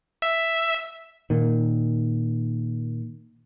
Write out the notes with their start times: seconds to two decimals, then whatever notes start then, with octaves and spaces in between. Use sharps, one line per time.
0.22 E5
1.30 A#2 D#3